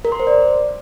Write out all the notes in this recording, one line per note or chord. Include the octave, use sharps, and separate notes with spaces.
A#4
C6
C5
D5